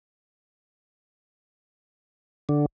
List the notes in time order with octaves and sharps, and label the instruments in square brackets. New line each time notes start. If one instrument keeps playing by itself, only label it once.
[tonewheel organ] D3